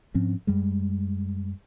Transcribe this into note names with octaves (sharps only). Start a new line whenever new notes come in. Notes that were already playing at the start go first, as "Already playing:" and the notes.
G#2 F3 C4 C#4
F#2 G3 G#3